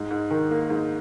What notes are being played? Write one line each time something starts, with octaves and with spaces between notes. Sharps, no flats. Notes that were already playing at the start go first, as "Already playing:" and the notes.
Already playing: G#2
G#2
D#3
A#3
G#2